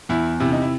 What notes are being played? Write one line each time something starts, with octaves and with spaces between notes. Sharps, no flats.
E2 E4
C3 E4
D#4
E4